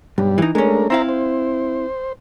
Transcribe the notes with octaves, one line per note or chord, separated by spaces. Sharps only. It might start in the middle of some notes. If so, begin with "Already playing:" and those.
B1 G2 G3
E3 D#4
G#3 A3 C#4 D4 A#4
C4 E4 C5 E5 F5 A#5
C5